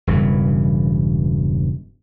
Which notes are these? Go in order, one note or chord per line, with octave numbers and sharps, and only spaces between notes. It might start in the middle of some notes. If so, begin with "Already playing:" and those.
E1 G2 C#3 E3